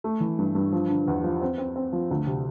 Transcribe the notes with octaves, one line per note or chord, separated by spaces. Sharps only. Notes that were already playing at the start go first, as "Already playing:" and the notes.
A3
E3
G2
G2
F3
D3
E2
F3
C4
C4
C4
F3
D2
C3